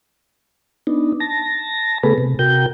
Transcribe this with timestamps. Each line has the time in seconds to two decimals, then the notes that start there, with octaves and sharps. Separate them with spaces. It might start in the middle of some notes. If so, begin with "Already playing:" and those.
0.87 B3 D4 D#4
1.20 A5 A#6
2.03 C#3 A3 B3 G#4 A4 B4
2.18 C3
2.39 C3 F#4 A#4 G5 G6